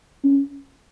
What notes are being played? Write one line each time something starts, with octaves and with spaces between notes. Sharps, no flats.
C#4